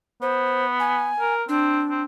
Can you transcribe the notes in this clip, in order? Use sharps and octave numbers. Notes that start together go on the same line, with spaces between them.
B3 C5
G#5
A#4
C4 D4
C4